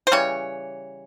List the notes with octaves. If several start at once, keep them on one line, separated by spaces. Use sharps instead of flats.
C5
C#3 E3 G3 C#5